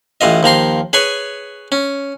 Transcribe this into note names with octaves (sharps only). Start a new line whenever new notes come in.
A1 E3 F4 D#5
D#2 F3 A#5 C6
G#4 B4 C#5 G#5
C#4